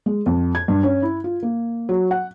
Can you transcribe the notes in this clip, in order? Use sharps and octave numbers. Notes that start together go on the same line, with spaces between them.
G#3
F2
G#6
G2
C#4
E4
F4
A#3
F#3
F#5